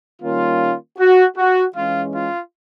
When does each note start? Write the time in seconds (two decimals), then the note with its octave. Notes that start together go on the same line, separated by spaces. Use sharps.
0.21 D#3 G3 A#3 C#4 F4
0.98 F#4
1.36 F#4
1.75 E3 G#3 C#4 F4
2.13 F4